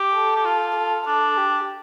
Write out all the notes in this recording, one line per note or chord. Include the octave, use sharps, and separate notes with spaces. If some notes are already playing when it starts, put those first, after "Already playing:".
Already playing: G4
A4
G4
F4
A4
D4 A4
G4